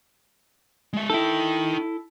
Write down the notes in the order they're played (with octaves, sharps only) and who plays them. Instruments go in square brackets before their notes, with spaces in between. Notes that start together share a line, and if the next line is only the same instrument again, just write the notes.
[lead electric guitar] G#3 E5
[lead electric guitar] D#4 G5 [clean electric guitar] E4 A4